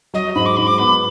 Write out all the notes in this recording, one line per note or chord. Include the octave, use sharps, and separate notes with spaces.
F#3 D#5
G#2 B5
D6
G#2 B5
D6
B3 B5